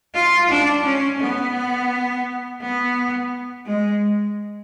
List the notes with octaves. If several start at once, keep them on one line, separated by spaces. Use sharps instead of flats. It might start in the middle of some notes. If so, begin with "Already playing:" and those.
F4
D4
C#4
B3
B3
G#3